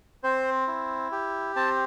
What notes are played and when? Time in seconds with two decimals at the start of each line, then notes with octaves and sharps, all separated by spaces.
0.23 C4 C5
0.68 E4
1.12 G4
1.56 C4 A5